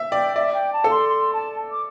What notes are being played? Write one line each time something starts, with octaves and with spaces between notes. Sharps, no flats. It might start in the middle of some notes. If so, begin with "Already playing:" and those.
Already playing: E5
D5 G5
D5 E5
G5
A5
A4
C6
C6
A5
D6